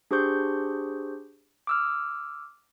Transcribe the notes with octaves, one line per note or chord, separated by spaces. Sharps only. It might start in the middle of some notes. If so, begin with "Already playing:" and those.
D4 G4 G#4 C5 C#6 G6
D6 E6 F6